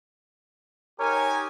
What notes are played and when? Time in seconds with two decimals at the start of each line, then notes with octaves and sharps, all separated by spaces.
1.00 D#4 G4 A#4 C#5 G#5